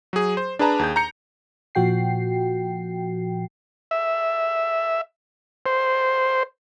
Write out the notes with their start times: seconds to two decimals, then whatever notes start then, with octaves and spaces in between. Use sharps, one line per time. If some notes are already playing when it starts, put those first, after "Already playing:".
0.13 F#3 G#4
0.37 C5
0.59 D4 G#4 B4 A5 A#5
0.79 D#2 G#4 G6
0.96 A#5 G6 C#7
1.75 A#2 F3 F#4 G5 C7
3.91 E5
5.66 C5